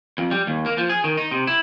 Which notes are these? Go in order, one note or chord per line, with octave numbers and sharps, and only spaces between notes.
F2
G3
D#2
A#3
F3
G#4
D#3
D#4
C3
E4